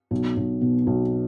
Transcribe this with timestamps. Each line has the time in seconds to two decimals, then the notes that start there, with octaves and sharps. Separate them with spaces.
0.11 B1
0.36 B1
0.61 B2
0.87 B1